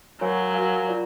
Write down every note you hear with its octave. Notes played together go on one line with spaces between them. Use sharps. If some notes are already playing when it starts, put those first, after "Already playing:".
F#3 F#4 A#4 C#5 F5 G#5
F#4 A#4 C#5 F5 G#5
F4 A#4 D5